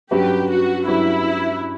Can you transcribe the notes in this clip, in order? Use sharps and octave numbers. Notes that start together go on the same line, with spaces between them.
G2 F#3 C#4 F#4 G4 B4
F#4
G2 F#3 C#4 E4 F#4 B4